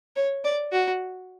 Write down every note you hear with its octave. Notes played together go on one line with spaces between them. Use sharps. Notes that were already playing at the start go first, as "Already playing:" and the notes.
C#5
D5
F#4